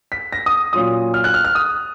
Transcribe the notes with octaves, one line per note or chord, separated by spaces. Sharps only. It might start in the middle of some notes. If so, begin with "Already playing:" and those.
B6
A#6
D#6
A#2 F#3 C#4 F4 D#6
F6
F#6
F6
F6
D#6